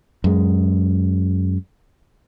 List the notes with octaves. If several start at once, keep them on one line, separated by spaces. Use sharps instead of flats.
F#2 G#3